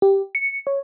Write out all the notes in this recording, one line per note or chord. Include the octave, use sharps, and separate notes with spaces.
G4
C#7
C#5